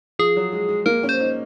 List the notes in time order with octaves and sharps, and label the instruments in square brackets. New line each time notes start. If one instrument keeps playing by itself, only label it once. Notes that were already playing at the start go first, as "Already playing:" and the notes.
[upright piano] F3 [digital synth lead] G#4
[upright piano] F#3
G#3
G#3
[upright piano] A#3 [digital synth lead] A#4
[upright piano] C#4
[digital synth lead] C5
[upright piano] D#4